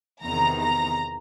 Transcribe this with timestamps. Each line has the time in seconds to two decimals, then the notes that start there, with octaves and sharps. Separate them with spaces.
0.23 E2 C3 D#3 A#5
0.62 A#5